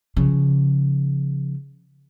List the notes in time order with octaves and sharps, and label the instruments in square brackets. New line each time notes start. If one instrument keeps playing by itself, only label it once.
[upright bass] C#3 F3